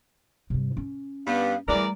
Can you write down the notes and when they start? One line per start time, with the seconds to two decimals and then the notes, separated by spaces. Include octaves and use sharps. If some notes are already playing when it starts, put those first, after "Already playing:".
0.50 G2 C3
0.77 C#4
1.27 G2 G3 B3 F5
1.68 E2 G3 A3 A#4 D5 A#5